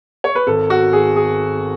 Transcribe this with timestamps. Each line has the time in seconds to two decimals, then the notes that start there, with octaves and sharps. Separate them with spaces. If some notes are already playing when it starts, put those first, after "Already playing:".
0.24 C#5
0.35 B4
0.47 G#1 A4
0.70 F#4
0.93 G#1 G#4
1.16 G#4